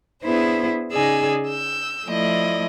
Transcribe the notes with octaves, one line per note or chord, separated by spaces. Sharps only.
B3 D4 E4 G#4 B4 C5
C#3 D#4 G#4 D5 G#5 E6
E6 G6
F3 A3 E4 D5 D#5